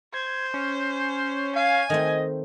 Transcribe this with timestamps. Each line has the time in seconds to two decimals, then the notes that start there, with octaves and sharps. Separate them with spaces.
0.14 C5 G#6
0.54 C#4
1.56 F5 G#5
1.90 D#3 A3 C4 D#5